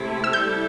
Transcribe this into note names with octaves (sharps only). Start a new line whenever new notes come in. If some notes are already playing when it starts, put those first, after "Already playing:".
Already playing: C3 A3 E4
E6
G3 E4 A4 G6